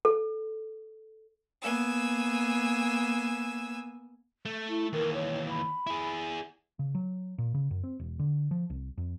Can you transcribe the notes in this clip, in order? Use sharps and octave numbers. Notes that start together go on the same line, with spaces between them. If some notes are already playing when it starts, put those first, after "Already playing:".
A4
A#3 B3 G#5 E6
A3
E4
D#2 E3 A#4
C#5
B5
E4 G#4
C#3
F#3
A#2
C#3
F#2
C4
E1
D3
F3
C2
F2